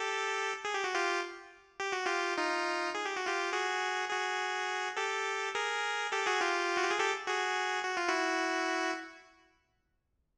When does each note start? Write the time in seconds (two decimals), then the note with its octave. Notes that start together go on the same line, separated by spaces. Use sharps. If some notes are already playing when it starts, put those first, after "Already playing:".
Already playing: G4 A4
0.65 G#4
0.75 G4
0.84 F#4
0.94 F4 G4
1.80 G4
1.92 F#4
2.05 F4 G4
2.37 D#4 F4
2.95 G#4
3.05 G4
3.16 F#4
3.26 F4 G4
3.53 F#4 G#4
4.10 F#4 G#4
4.97 G4 A4
5.55 G#4 A#4
6.12 G4 A4
6.27 F#4 G#4
6.41 F4 G4
6.77 F#4
6.83 G4
6.91 G#4
6.99 G4 A4
7.27 F#4 G#4
7.85 F#4
7.97 F4
8.08 E4 F#4